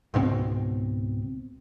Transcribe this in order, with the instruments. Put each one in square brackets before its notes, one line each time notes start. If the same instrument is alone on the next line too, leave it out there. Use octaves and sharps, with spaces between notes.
[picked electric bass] C#2 G#2 B2 C4